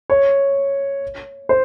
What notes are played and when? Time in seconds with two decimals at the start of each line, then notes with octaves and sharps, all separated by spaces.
0.10 C#5
1.49 C5